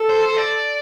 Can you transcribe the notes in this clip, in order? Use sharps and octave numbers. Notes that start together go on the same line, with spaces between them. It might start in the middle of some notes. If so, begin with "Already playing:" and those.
Already playing: A4
C5
D5